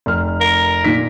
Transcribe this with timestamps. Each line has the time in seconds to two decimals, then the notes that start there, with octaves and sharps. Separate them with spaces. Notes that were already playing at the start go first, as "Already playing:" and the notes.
0.06 F1 F6
0.41 A#4
0.84 A#2 D#3 B6